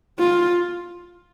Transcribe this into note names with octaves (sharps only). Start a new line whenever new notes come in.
F4